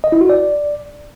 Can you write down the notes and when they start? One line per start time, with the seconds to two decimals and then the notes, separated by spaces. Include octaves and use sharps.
0.04 D#5
0.12 E4
0.21 F#4
0.30 D5